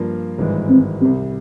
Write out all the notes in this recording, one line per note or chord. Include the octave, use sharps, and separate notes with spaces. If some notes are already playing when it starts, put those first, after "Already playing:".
Already playing: G2 F3 A#3
G#1 G2 E3 G#3
C4
C2 C3 G3 C4